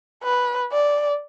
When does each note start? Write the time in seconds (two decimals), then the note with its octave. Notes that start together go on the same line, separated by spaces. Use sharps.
0.24 B4
0.73 D5